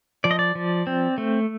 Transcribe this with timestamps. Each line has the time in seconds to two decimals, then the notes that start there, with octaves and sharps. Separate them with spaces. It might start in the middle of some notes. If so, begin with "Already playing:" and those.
0.24 F3 D5
0.31 D#5
0.39 D5
0.55 F3
0.87 C4
1.18 A3